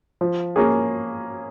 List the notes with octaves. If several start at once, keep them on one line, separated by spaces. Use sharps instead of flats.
F3
A#3 C#4 G#4